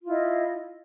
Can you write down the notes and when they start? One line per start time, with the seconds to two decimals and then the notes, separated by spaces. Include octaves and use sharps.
0.02 F4
0.07 E4
0.11 D#5